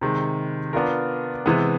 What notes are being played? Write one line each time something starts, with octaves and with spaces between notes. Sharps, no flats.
C3 D#3 G#3
B3 D4 F4 A#4
C3 E3 G#3 B3